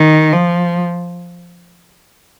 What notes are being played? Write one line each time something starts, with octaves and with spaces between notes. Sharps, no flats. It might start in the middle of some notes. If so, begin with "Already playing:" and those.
Already playing: D#3
F3